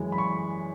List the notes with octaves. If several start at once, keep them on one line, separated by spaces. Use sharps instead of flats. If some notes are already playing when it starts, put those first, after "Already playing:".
Already playing: F#2 E3 G#3
B5
C#6